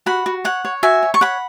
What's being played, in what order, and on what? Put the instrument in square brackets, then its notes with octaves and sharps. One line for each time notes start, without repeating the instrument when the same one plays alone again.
[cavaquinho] F#4 F#5 B5
F#4
C#5 F#5
C#5
F#4 E5 G#5
C#5
C#6
C#5 F#5 B5